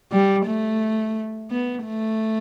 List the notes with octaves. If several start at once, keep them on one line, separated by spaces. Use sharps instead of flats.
G3
A3
B3
A3